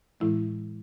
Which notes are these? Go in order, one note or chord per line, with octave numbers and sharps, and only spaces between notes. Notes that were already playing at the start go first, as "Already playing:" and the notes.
A2 E3 G#3 E4